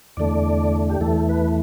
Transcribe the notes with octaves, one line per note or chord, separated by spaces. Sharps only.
E2 D3 A3 D5
G4
E2 E3 A3 A4
B4